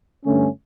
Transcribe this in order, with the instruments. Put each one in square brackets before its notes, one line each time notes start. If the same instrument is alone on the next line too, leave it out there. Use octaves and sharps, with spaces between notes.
[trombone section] G2 D3 A3 C#4